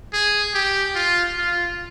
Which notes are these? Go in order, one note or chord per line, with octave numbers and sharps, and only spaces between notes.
G#4
G4
F4
F4